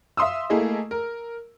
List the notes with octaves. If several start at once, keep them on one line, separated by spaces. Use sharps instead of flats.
E5 F5 C6 D#6 E6
A3 A#3 E4 G#4 A4 D#5
A#4